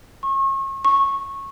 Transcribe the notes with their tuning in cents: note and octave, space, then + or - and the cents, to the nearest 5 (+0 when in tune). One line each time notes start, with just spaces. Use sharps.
C#6 -35
C#6 -15